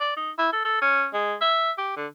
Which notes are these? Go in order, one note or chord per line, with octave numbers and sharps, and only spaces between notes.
D5
D#4
E4
A4
A4
C#4
G#3
E5
G4
D3